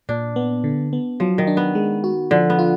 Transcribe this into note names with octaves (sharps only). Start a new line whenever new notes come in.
A#2 D4
B3
D3
B3
F3 F#3
D#3
D4
B3
G#3
F#4
D3 F3
B3
F4